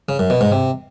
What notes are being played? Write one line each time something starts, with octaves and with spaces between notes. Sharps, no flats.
C#3
F#2
B2
G#2
C3